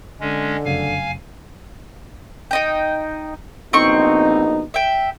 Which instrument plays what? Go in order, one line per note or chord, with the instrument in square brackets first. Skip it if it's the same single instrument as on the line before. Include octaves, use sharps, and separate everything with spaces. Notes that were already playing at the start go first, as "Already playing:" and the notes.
[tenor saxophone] D3 [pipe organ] G#3 C#4
[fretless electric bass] F1 F#2 C#3 [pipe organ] F5 G#5
[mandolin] D#4 D#5 G5
[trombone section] A#1 B2 D#4 [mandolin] C4 C#6
[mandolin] E5 G5